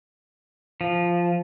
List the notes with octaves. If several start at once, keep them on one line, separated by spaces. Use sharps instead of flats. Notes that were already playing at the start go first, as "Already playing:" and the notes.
F3